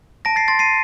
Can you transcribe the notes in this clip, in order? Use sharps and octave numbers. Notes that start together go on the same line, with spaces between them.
A5 A#6 D7
A6 C7
C6 A6
C7 D#7